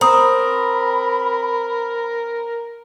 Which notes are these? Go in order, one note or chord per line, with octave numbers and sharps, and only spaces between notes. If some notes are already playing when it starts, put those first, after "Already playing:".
C4 A#4 A#5 B5 D#6